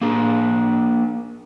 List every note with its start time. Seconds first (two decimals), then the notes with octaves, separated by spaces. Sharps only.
0.01 A#3 D4 G#4